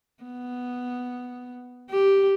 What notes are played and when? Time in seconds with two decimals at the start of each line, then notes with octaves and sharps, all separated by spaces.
0.24 B3
1.91 G4